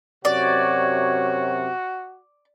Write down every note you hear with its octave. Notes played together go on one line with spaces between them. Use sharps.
F#2 C3 F#4 C#5 D5